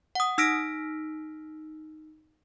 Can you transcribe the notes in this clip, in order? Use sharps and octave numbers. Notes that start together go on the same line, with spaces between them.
F#5 D#6
D#4 E6 F6 A#6 B6 D7